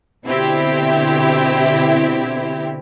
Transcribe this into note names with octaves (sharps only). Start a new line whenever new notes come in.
B2 D3 C4 E4 G4